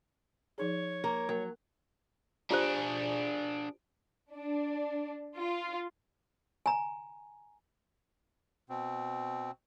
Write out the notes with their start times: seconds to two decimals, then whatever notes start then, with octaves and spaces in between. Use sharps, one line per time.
0.58 F3 D#4 G#4 C#5
1.04 A#3 A#4
1.29 F#3 A#3 A#4
2.51 D4 F4 G4 G#4 C5
4.33 D4
5.37 F4
6.66 G#5 A#5
8.69 B2 C4